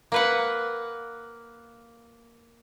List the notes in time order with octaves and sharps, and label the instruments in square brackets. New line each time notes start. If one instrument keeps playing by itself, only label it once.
[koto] A#3 B4 F#5